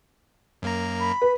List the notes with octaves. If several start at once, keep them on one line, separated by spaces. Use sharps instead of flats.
F#2 A#3 A#5
B5
B4